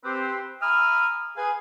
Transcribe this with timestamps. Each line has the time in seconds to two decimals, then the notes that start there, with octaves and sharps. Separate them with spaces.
0.04 C4 G4 B4 C5
0.61 E5 G#5 A#5 B5 D#6 F6
1.37 G#4 B4 F5 G#5